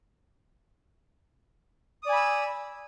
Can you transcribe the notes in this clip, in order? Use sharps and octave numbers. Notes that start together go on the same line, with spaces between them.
D5 G#5 B5 D#6 E6